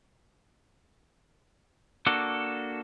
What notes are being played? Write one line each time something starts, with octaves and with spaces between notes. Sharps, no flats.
A#3 D4 F#4 A4